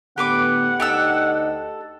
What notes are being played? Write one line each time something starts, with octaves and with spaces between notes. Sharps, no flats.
A2 D3 B3 G4 B4 F#5 D6
D2 D#4 G4 A4 D#5 E6